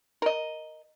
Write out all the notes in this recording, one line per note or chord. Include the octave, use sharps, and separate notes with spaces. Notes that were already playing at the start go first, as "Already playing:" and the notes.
A#4 D#5